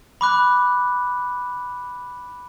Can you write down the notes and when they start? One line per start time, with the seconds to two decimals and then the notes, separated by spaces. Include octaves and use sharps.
0.21 B5 D6 F#6